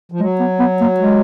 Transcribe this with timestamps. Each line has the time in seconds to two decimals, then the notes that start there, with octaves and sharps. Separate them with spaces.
0.12 F3
0.20 F#3 G#3
0.40 B3
0.60 B3
0.81 A#3
1.00 G#3